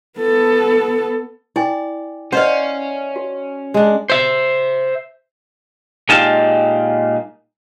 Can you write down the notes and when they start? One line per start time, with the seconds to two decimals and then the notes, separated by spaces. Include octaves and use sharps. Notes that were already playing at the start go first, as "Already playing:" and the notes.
0.19 B3 A4
1.56 E4 D5 G5 G#5
2.32 C#4 C5 D5 D#5 F5 F#5
3.16 F#4
3.74 G#3 D4
4.10 C5 E5
6.09 A#2 G#3 D#4 G4 F5 A5